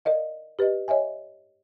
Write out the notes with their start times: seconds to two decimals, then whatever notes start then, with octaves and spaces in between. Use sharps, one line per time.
0.05 A#4 D5 D#5 F5
0.59 G4 B4 D5 D#5
0.88 C#5 D#5 E5 G#5